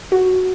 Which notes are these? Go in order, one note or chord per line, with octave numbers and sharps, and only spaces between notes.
F#4